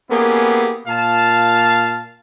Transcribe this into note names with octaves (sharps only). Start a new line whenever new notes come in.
A#3 B3 C#4 E4 G4 G#4
A#2 F5 A5